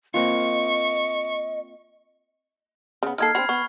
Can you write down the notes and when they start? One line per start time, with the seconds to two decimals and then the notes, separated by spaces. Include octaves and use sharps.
0.14 A#3 C4 F4 D#5 C#6
3.03 C#3 B3
3.18 D#3 A#3 A4 F6 G#6 C7
3.35 C4 D4 F#4 B5
3.49 B3 B5 C#6